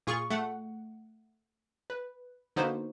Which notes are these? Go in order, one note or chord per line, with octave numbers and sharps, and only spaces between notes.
A#2 F4 G#4 C#6
A3 F#5
B4
D3 A#3 B3 D#4 F#4 C5